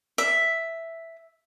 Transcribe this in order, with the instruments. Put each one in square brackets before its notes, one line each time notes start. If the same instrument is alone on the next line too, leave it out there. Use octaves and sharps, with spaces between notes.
[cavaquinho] E5